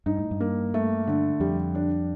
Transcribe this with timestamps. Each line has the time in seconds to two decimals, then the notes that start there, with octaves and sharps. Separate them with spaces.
0.06 G2 D#4
0.19 A2
0.31 G2
0.40 A#3
0.74 A3
1.07 D3
1.40 F2 G3
1.75 D4